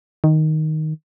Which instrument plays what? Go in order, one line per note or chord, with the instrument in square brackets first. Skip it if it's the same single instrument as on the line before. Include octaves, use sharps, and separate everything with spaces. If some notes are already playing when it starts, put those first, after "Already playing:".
[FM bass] D#3